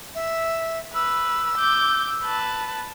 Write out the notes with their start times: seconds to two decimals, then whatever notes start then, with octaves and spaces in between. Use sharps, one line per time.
0.14 E5
0.94 B4 E6
1.58 D6 G6
2.23 B4 A5